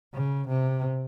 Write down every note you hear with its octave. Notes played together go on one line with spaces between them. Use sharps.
C#3
C3